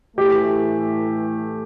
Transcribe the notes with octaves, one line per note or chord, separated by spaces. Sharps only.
A2 E3 A3 G4